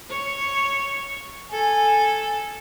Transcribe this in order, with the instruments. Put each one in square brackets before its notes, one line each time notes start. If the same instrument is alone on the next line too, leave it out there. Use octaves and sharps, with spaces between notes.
[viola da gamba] C#5
[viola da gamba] A4 [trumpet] G#5